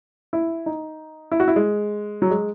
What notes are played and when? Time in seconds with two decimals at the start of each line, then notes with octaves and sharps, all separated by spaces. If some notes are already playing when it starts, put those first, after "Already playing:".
0.33 E4
0.66 D#4
1.31 E4
1.40 F#4
1.48 E4
1.56 G#3
2.22 F#3
2.31 G#3